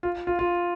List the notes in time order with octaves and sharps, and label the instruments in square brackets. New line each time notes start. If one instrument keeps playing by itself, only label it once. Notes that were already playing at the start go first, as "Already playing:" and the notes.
[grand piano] F4
F4
F4